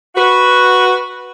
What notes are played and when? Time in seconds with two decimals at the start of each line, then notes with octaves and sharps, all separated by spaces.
0.15 F#4 B4